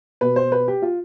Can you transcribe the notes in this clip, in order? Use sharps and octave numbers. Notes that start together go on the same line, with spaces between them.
B2 B4
C5
B4
G4
F4